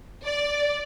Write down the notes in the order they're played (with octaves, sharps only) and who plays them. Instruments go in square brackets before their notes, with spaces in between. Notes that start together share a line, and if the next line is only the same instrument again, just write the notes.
[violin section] D5